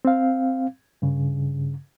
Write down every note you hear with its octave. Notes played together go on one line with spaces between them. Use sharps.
C4 F5
G2 C#3